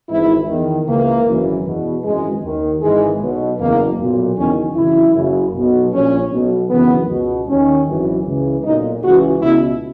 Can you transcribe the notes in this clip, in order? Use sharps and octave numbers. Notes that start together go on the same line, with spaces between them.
G#1 G#2 E3 E4
E2 D#3
C#2 C#3 E3 A#3
G#1 F#2 E3
E2 B2
G#1 F#2 E3 G#3
D#2 D#3
G#1 G#2 E3 G#3
B1 B2
F#1 E2 B2 A#3
B1 A#2
F#1 E2 D#3 C#4
G#1 F#2 C#3 E3 E4
F#1 F#2 C#3
B1 B2
A#1 A#2 C#4
B1 B2
G#1 F#2 C#3 E3 B3
C#2 B2
D#2 D#3 C#4
G#1 F#2 E3
C#2 C#3 E3
B1 A#2 D#4
C#2 C#3 E3 F#4
C#2 B2 E4